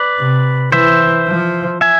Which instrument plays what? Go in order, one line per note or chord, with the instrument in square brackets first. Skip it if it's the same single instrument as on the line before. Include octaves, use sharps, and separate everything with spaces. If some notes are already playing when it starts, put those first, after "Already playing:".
Already playing: [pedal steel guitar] B4 D5
[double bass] C3
[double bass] E3 [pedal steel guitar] C5 E5
[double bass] F3
[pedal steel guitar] E5 G#5